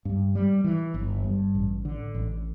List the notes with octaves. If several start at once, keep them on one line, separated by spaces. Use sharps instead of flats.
G2
G3
E3
G1
G2
A1
D3
A1